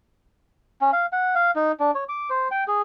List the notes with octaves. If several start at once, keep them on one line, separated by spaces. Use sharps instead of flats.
C#4
F5
F#5
F5
D#4
D4
C#5
D6
C5
G5
G#4